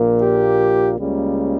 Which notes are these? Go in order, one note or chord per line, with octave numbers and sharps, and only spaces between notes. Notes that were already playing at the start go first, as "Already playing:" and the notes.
Already playing: A#1 A#2 A#3
G4
C#2 C#3 G3 A#3